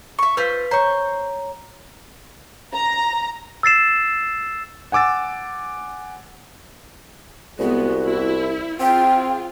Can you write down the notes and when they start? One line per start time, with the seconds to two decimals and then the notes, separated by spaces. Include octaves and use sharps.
0.19 E5 C#6
0.37 F4 B4 C5 E6 B6
0.71 C5 C#5 A#5 C#6
2.74 A#5
3.63 E6 A6 C7 E7
4.92 F#5 G#5 D6 E6 A6
7.59 C2 G#3 B3 F#4
8.04 E4
8.80 C4 F4 G#4 G5